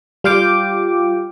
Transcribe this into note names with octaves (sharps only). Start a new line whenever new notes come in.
G3 F4 F5 G5 D6